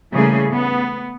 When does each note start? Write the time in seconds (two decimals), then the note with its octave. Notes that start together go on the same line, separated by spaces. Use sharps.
0.12 C#3 E3 G3 A3 A#3 G#4
0.49 B3